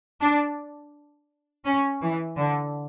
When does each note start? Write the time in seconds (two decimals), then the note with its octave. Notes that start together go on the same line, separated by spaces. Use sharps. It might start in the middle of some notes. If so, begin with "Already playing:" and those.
0.21 D4
1.65 C#4
2.01 E3
2.37 D3